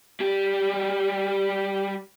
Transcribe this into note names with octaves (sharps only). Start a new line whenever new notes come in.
G3 G4